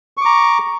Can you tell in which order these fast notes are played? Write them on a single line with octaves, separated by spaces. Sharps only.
C#6 D6 A#5